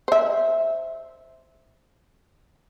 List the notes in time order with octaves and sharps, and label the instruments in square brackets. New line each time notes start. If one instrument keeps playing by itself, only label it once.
[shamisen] C5 E5